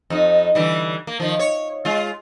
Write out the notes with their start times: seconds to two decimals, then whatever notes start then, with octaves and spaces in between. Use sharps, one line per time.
0.10 F2 D#4
0.55 D3 E3 G3
1.07 A#3
1.20 D#3 F3
1.39 C#5
1.85 G#3 F4